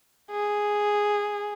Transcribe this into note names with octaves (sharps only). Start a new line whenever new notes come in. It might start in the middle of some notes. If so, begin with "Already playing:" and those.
G#4